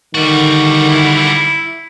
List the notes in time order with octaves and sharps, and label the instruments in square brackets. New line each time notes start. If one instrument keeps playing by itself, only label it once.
[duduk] D3 [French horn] D#3 [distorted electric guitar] G3 F#4
[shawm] E4